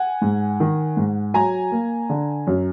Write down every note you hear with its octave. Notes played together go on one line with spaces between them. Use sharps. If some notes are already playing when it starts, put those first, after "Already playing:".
Already playing: F#5 G#5
G#2
D#3
G#2
F#3 G#5 A#5
A#3
D3
F#2